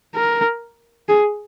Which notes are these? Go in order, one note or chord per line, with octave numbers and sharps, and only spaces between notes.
A#4
G#4